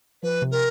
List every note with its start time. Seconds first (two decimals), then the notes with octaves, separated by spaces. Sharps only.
0.23 F3 B4
0.42 C3
0.51 A#4